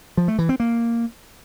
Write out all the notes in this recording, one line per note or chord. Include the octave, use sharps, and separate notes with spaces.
F3
A3
E3
C4
A#3